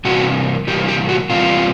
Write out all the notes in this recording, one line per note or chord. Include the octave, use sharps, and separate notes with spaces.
C3 E3 G3 A#3 F#4
C3 E3 G3 A#3 G4
G4
F#4
C3 E3 G3 A#3 F4